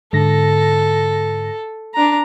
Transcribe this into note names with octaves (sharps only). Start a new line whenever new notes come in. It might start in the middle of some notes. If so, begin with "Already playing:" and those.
G#2 D3 A4 A#6
D4 A#5